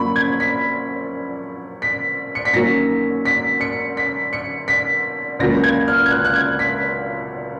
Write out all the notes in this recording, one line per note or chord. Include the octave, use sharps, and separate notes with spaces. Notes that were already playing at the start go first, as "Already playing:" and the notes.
Already playing: F#2 F3 A#3 C#4 B5 C#6
G#6
B6
B6
C#7
B6
F#2 D#3 F#3 A#3 C#4 A#6
B6
C#7
B6
C#7
B6
C#2 C#3 F#3 A#3 C#4 A#6
G#6
F6
G#6
F#6
F#6
G#6
B6